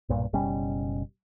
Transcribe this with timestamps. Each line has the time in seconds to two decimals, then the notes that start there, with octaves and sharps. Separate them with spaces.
0.09 B1 G2 A#2
0.33 F#1 B2 G3 C#4